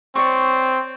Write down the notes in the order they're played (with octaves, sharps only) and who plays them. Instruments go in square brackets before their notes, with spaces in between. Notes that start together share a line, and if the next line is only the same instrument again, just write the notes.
[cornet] C4 [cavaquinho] C#5 D5 C#6